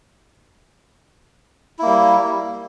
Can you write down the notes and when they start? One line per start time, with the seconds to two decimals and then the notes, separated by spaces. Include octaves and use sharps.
1.79 E4
1.82 A#3
1.86 G3